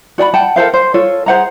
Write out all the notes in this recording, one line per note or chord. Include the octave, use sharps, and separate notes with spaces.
F#4 D5 G5 B5
F#5 G5 A5
A4 A#4 C5 F5
C5
F4 A4 C#5
G#4 C5 F#5 A#5